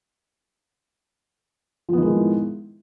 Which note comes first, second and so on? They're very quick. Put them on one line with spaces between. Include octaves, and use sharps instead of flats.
F3 B3 D#3 G#3 A2